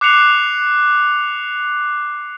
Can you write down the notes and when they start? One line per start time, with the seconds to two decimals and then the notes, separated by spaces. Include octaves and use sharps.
0.01 D6 F#6 C7 C#7 F7